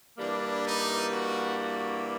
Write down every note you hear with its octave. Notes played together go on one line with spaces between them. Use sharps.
G2 E3 G3 A#3 D4
D#4
F#4
F#4